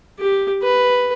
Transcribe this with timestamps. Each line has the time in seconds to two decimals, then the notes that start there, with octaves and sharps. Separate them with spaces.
0.19 G4
0.63 B4